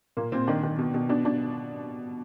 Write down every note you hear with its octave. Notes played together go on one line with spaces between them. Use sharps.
A#2 A#3
A#2 C4
D#3 D4
D#3
B2
B2
B2 D4
B2 D4